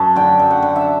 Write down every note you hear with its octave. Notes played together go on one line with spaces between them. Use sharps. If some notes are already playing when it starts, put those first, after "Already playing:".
Already playing: F#2 A5
D3 G5
F#2
F#5
D3
E5